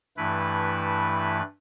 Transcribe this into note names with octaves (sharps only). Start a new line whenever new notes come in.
G2 E3 A3 E4 B4